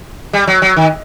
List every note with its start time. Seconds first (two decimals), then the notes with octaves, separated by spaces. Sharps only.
0.33 G3
0.47 F#3
0.62 F#3
0.76 D#3